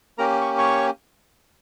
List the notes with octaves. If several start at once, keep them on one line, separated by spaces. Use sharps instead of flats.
A#3 C#4 G4 A#4 A#5
C#6
C#5 C#6